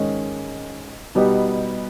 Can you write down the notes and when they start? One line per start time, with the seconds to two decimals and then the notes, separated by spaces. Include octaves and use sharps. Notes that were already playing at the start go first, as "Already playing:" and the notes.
Already playing: G#2 D#3 G#3 C#4
1.15 B2 G3 B3 D#4 G4